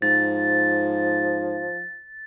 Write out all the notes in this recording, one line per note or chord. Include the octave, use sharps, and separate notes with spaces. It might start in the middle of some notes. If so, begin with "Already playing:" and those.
G#2 F3 A6